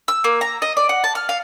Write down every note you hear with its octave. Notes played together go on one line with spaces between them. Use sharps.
E6
A#3
A#5
D#5
D5
F#5
A5
F6
F5